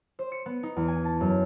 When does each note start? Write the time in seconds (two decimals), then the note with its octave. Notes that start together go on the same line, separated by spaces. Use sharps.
0.19 C5
0.32 C#7
0.46 B3
0.63 D#4
0.76 E2
0.88 G#5
1.05 A5
1.21 F#2